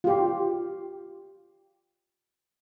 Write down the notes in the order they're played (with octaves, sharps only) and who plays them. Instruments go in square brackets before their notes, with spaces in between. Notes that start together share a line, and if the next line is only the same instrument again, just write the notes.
[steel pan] F4 G4